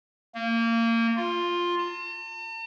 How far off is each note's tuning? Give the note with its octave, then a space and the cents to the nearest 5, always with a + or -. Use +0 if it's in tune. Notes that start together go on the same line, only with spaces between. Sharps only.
A#3 -25
F4 +5
A5 +45